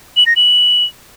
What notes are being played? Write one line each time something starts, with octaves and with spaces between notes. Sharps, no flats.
F#7
A#6
F#7